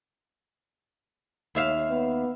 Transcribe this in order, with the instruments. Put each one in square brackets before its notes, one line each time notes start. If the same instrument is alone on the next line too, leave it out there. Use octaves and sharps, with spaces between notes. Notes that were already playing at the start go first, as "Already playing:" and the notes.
[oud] D#2 E5 F5
[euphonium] B3